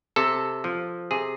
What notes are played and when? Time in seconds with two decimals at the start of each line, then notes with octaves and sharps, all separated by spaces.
0.16 C3 A4
0.64 F3
1.11 C3 G#4